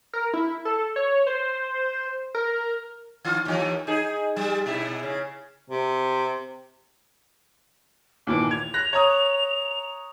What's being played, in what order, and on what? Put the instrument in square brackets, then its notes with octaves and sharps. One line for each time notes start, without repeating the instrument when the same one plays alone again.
[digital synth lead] A#4
E4
A4
C#5
C5
A#4
[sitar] D#3 F4
D#2 E3
D#4 G#4
G3
B2 E4
C#3
[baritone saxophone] C3
[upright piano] D#2 A#2 E3 [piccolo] D6
[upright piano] G#6 [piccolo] F7
[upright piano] F#6 A#6
C#5 A#5 D#6